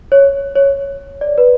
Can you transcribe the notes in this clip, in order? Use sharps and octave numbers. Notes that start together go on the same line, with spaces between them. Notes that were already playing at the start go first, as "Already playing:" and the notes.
C#5
C#5
D5
B4